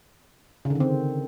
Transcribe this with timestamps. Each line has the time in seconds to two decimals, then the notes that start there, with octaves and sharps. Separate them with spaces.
0.65 C#3
0.70 D3
0.75 D#3
0.80 C4